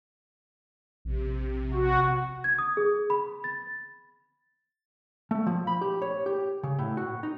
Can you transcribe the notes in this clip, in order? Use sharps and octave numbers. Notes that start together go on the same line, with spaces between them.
A#1 C3
F#4
G#6
D#6
G#4
B5
A6
A3
F3
B5
G4
C#5
G4
C#3
A2
F#4
D#4